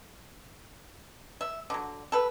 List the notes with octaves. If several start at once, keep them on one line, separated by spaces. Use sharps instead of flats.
E5
D3 F#3
A4 B4